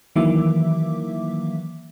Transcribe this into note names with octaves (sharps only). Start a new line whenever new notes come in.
D#3 E3 F#3 A#3 E5 D6